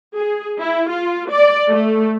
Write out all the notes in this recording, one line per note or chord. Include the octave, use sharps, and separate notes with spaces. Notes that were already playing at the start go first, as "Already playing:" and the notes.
G#4
E4
F4
D5
A3